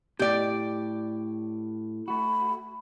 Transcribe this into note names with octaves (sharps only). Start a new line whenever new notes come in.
A2 G4 D5
A3 F#4 B5